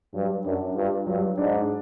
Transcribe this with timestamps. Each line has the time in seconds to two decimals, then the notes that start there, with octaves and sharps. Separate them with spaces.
0.14 G2 F#3
0.45 F#2 D4
0.75 G2 F4
1.07 G2 F#3
1.37 G#2 D4